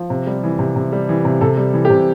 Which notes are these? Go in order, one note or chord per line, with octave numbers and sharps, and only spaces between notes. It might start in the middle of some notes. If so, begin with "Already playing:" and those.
Already playing: F3
C3
G3
E3
C3
C3
G3
E3
C3
C3 A4
G3
E3
G4
C3